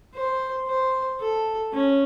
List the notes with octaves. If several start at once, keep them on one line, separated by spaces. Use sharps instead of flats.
C5
C5
A4
C#4